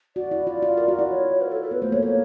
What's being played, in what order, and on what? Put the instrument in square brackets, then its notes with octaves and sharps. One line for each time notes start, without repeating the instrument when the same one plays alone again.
[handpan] F#4 [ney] D5
[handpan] E4
[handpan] F4 [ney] D5
[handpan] F4
A#4
F#4
E4
[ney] C#5
A#4
A4
A4
[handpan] B3 [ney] B4
[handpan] A3 [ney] C5
[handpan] A#3 [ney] C#5
[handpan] A#3 [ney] C#5